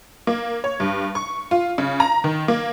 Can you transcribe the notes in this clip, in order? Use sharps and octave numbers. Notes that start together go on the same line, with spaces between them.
A#3
C#5
G2
C#6
F4
C#3
A#5
D#3
A#3